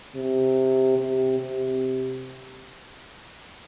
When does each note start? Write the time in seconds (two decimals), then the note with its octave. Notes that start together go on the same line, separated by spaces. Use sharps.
0.15 C3
0.98 C3
1.39 C3